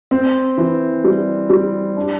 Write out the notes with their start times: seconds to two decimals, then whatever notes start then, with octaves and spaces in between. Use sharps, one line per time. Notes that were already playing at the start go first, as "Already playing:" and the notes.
0.11 C4
0.58 E3
1.04 G3
1.50 G3
1.97 D4